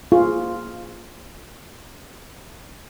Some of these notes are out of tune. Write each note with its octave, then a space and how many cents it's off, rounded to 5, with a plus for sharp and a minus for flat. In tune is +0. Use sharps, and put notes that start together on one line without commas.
F4 +0 G#4 +0